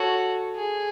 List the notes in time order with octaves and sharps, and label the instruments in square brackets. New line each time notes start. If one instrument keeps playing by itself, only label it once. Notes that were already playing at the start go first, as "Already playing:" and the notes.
Already playing: [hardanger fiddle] F#4 [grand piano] A4 C#5
[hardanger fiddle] G#4